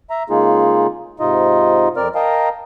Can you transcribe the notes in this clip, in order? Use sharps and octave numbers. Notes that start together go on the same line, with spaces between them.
E5 A#5
C#3 G#3 A#3 D#4 F4 G#4
G#2 C3 D#4 F4 D#5
F2 C4 A#4 D5 F6
A#4 D#5 F5 G5 A5 A#5